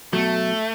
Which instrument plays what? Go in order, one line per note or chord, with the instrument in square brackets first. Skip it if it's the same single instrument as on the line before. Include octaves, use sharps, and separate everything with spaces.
[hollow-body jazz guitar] B1 B2 F#3 [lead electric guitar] A3